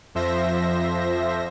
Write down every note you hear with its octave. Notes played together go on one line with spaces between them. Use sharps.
F2 F3 C5 E5 A#6